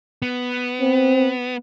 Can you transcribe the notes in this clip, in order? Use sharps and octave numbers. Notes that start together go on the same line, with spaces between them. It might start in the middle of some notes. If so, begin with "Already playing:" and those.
B3
C4